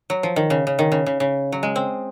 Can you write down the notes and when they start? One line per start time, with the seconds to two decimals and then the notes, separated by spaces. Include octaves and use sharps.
0.10 F#3
0.23 F3
0.36 D#3
0.50 C#3
0.67 C#3
0.79 D#3
0.92 C#3
1.06 C#3
1.20 C#3
1.52 F#3
1.63 G#3
1.76 C4